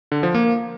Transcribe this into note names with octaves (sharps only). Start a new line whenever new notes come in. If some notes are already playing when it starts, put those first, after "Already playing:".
D3
F3
A#3